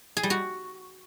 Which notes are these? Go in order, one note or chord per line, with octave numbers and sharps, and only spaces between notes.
G#4
G3
F#4